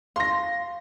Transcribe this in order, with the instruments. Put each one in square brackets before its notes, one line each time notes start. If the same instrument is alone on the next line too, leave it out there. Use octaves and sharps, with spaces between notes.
[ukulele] F5 [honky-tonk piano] C6 A#6